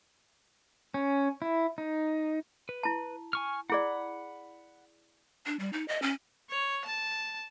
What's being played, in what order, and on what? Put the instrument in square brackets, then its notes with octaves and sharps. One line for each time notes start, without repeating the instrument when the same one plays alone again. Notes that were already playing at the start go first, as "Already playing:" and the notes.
[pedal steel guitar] C#4
E4
D#4
B4
[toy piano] E4 A5
[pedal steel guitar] G#5 C#6 F6
[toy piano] E4 G#4 D5 [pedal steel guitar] F#5 B5
[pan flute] D4
G3
D#4
D#5
C#4
[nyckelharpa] C#5
A5